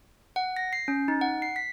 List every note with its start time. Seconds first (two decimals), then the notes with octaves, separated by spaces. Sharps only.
0.36 F#5
0.57 A#6
0.73 C7
0.88 C#4
1.08 D#4
1.21 F#5
1.42 C7
1.56 B6